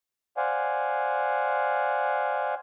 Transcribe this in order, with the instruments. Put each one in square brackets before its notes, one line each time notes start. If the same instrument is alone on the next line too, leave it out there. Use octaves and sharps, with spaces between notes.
[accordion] C5 D5 F5 F#5 G#5